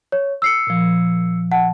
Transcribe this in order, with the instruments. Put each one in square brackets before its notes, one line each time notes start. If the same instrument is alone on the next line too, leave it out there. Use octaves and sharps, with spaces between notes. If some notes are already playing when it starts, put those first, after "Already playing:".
[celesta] C#5
E6 C7 C#7
[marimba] A#2 F3
[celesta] F#5 [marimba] A5